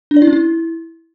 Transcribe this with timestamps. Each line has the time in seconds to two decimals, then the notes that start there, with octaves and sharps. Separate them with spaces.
0.11 D4
0.16 D5
0.22 E4
0.27 C#4
0.33 E4